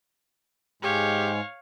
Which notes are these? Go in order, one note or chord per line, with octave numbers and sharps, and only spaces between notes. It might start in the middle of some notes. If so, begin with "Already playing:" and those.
G#2 G#3 G4 C#5 F5